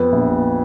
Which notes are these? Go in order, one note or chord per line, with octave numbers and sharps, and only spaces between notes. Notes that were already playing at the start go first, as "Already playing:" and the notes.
Already playing: F2 B3
A#1